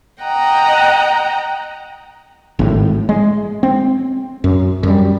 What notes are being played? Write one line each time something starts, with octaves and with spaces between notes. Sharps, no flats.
D#5 F#5 G5 A#5
G#1 A2
G#3
C4
F#2
F#2 G3